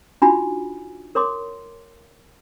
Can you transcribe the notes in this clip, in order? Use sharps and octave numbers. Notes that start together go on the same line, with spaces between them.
D4 D#4 F4 F#4 G#5 B5
A#4 C#5 C6 D6